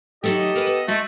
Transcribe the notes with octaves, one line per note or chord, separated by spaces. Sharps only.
D#3 F#3 A3 G4 A4 D#5
A#4 B4 G#5
B3
G#3 A3 F#4